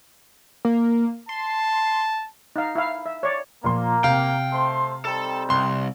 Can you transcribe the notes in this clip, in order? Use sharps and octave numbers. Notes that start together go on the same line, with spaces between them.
A#3
A5 C6
D#4 F5
E4 F5
E5
C#5 D5
A#2 F3 A#3 C6
C3 F5 G5
A3 C5 C6
G3 C4 D#4 A4
C2 C6